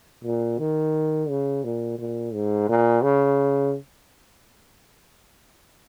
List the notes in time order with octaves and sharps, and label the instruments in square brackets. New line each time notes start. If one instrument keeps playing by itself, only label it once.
[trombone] A#2
D#3
C#3
A#2
A#2
G#2
A#2
C#3